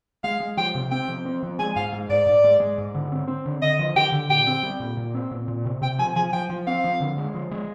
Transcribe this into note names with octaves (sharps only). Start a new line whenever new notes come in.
G#3 F5
G#3
F3 G5
C3
C4 G5
F3
C4
F3
G#3 G#5
G#2 F5
G#3
G#2 D5
G#2
G#3
G#3
G#2
D3
C4
C4
D3
D3 D#5
F3
D3 G5
D3
A#2 G5
C4
G3
A#2
A#2
C4
A#2
A#2
C3
C3 G5
F3 G#5
F3 G#5
F3 G5
F3
C4 F5
F3
D3
G#3
F3
G#3